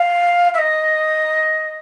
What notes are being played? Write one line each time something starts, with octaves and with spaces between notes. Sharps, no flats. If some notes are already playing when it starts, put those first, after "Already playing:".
Already playing: F5
E5
D#5